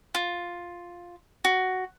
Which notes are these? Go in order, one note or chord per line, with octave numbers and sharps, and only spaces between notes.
F4
F#4